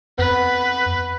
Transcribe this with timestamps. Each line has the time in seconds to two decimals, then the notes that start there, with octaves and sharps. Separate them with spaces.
0.19 F2 B3 B4